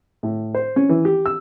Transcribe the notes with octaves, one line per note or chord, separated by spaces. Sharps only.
A2
C5
C#4
E3
G4
E6